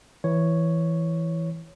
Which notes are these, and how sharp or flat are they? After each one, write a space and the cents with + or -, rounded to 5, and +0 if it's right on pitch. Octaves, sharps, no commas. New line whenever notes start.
E3 +0 C#5 +0